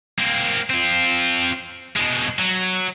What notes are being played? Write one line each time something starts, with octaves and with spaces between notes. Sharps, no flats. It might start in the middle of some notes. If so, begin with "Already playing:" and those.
A#3 C4
C4 F4
B2 G#3
F#3